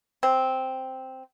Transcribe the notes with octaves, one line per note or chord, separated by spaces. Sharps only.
C4